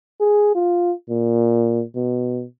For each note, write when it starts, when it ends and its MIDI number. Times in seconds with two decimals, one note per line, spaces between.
0.20 0.55 68
0.55 0.92 65
1.10 1.83 46
1.95 2.44 47